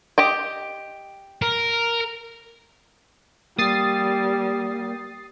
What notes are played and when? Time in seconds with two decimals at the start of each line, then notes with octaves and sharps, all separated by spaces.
0.18 G4 D#5 G5
1.42 A#4
3.58 G3 A#3 D#6 A6 C7